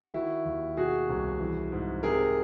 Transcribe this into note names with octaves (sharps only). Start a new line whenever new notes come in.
D#3 E4 F#4
D#2
B2 F#4 G#4
C2
E3
G#2
C3 G#4 A#4